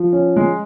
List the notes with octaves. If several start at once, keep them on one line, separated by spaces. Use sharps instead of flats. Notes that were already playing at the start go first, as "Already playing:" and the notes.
Already playing: F3
C#4
G#3